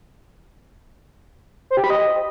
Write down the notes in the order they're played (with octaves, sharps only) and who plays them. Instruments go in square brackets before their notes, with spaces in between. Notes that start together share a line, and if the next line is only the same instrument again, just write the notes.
[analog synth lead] C5
G4
B5
D#5